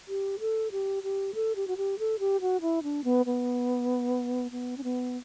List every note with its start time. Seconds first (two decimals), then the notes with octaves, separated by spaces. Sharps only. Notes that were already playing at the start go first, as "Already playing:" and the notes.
0.08 G4
0.40 A4
0.72 G4
1.03 G4
1.34 A4
1.56 G4
1.68 F#4
1.77 G4
1.99 A4
2.19 G4
2.41 F#4
2.61 E4
2.83 D4
3.04 B3
3.26 B3
4.52 B3
4.78 C#4
4.84 B3